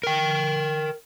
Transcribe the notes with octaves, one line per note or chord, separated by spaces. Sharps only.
A#4 G5